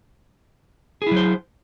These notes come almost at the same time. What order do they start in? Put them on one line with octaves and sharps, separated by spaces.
G#4 E4 F#3 C5